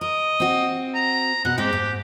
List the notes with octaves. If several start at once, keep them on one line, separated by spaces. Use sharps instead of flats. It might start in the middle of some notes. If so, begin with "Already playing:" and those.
A#4 D#5
C4 F#4
A#5
B2 F#5
G#2 G#3 C4 G4
G#2